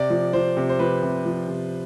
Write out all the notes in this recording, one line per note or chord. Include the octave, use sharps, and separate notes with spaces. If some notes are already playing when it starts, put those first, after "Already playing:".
Already playing: C3 D5
F3
F3 C5
C3
C5
F3 B4
C3
F3
C3